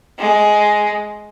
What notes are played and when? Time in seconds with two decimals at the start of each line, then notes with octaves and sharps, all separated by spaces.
0.19 G#3